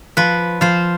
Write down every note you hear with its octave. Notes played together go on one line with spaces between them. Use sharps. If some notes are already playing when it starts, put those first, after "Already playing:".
F3 B4
F3 C5